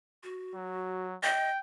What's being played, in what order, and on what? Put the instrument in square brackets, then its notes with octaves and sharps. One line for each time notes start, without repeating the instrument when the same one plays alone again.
[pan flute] F#4
[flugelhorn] F#3
[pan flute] D#5 [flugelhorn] G5